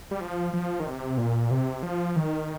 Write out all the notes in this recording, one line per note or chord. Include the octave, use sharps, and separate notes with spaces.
G3
F3
F3
D#3
C3
A#2
C3
F3
D#3